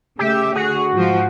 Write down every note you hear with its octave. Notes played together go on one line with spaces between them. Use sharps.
C#3 A3 G4 E5
D3 F#4 G#4
G#2 F3